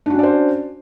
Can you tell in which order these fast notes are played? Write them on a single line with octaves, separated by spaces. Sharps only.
D4 F#4 C#4 D5 C5